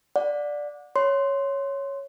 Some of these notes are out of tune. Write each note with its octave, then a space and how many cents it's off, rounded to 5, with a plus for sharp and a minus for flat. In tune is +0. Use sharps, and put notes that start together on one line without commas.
D5 +0 F#5 -30
C#5 +0 C6 +0